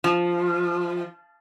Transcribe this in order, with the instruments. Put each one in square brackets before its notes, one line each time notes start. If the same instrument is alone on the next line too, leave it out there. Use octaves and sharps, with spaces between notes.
[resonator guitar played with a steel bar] F3